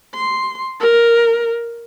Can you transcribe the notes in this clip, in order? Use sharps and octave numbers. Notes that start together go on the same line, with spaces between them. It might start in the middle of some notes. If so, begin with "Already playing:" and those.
C6
A#4